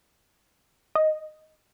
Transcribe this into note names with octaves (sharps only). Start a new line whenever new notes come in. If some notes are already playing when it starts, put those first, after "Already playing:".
D#5